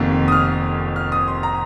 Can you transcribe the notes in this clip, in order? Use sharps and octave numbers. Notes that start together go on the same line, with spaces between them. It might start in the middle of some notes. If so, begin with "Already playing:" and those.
Already playing: F1 F2 D#3 A#3
D#6
F6
F6
D#6
C6
A#5